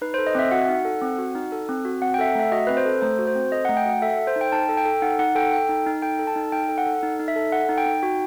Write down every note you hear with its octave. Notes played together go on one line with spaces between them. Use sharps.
D#4 B4
C5
A4
D#5
C4 E5
F#4 F#5
D#4
A4
C4
F#4
D#4
A4
C4
F#4
C4 F#5
G5
A4 E5
F#5
A3 E5
F#4 D#5
C4 B4
C5
A4
A3 C5
F#4
C5
C4
A4 D#5
F#5
A3
G5
F#4 F#5
A4 E5
A4
C5
D#4
G5
D#4 A5
A4
G5
A4
D#4 F#5
D#4 F#5
A4 G5
A4 G5
D#4
D#4
A4 G5
A4
A5
D#4
D#4 G5
A4
F#5
A4
D#4
D#4
E5
A4
A4 F#5
D#4
G5
D#4
F#4